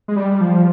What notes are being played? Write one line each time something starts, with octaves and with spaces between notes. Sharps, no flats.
G#3
G3
F3